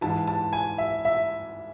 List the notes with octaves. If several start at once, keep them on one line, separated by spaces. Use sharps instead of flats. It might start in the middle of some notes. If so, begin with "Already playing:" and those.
G#2 E3 A5
A5
G#5
E5
E5